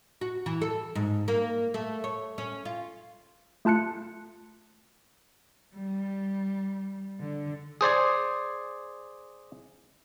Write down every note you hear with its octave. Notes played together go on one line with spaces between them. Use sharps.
F#4
E3
A4
G#2
A#3
A3
C#5
C#4
F4
A3 F4 A5 F#6 C#7
G3
D3
G#4 C5 D5 G#5